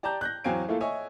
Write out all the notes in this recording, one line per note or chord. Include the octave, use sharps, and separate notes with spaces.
G4 D5 A5 A#5 G6
F#6 G6 A#6
E2 F#3 C4 F5 G#5 D7
A3 A#3 E4 F4 A4
C#5 D#5 E5 G#5